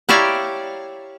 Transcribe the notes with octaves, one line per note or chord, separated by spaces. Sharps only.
E4 G4 C#5 D5 F5 A#5